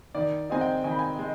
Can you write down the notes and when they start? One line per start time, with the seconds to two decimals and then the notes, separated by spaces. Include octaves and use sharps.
0.15 D#3 D5
0.50 G#3 C4 D#4 G#5
0.61 G5
0.84 D#3 G#5
0.91 B5
0.99 G#5
1.19 G#3